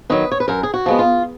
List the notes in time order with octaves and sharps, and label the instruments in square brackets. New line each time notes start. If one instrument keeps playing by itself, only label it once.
[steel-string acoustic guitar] D#3 F#3 B4
C#5
B4
F#2 A#4
G#4
F#4
F3 G#3 B3
F4